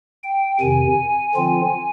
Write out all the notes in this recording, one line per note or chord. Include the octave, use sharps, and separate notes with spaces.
G5
F2 C3 D#3 G#5
D3 F3 C4 F4